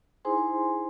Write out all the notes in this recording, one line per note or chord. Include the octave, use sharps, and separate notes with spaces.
D#4 E4 G#4 C5 G#5 C6